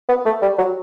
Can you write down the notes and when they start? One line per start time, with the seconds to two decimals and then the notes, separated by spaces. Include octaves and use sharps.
0.09 B3
0.26 A3
0.42 G3
0.58 F#3